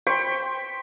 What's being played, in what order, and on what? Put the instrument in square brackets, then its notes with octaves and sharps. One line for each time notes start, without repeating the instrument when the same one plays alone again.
[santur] C5 G5 B5 C#6